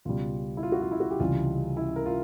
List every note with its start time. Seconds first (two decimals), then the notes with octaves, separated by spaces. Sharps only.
0.05 C#2 B2 G3 F4
0.57 E4
0.63 F4
0.72 F#4
0.82 F4
0.92 E4
1.00 F#4
1.11 G4
1.20 C#2 C3 E3 G3 F4
1.77 E4
1.96 A#4
2.06 F4